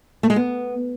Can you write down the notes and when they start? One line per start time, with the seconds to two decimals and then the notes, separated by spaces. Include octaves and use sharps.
0.23 A3
0.30 G#3
0.36 B3